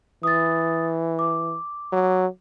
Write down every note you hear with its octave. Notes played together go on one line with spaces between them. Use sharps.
E3 D#6 A6
D6
F#3